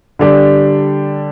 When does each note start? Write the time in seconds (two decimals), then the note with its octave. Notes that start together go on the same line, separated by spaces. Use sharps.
0.19 D3 G3 D4 G4